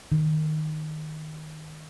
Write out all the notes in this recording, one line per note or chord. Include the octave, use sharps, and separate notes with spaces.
D#3